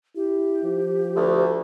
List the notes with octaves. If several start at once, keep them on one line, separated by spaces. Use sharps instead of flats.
E4 G4
F3
D2